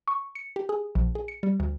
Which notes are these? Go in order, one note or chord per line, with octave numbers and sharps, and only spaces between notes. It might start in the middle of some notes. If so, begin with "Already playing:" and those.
C#6
C#7
G4
G#4
A#1
G#4
C#7
G3
D2